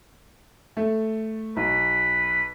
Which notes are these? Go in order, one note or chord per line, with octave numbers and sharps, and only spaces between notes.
A3 A4
B1 B4